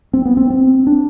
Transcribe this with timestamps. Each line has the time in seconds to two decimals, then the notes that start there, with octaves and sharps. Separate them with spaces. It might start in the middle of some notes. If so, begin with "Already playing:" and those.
0.13 C4
0.25 B3
0.37 C4
0.50 C4
0.87 D4